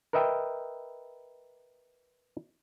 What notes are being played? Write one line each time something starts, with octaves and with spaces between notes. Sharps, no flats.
A#4 B4 D#5 E5 G5